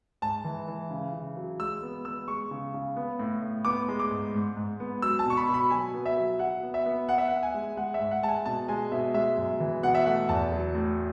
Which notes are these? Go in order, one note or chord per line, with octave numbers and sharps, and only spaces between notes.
G#2 A5
E3
E3
C#3
C#3
F#3
G#3 E6
B3
B3 E6
G#3 C#6
C#3
C#3
B3
A2
A2
B3 D6
G#3
D6
G#2
G#2
G#2
B3
F#3 E6
A5
B2 C#6
B5
B2
B5
F#3 G#5
B3
E5
F#3
F#3 F#5
B3
E5
B3
B3 F#5
E5
B3 F#5
G#5
G#3
G#3 F#5
E5
G#2
F#5
G#3 A5
G#5
B2 A5
G#3 G#5
B2 E5
G#3 E5
F#2
E3
B2 F#5
E5
A3 F#5
E2 A5
F#3
A2